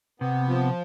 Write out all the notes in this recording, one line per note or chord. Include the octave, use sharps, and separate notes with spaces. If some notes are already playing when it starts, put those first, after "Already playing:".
C3 B3
F3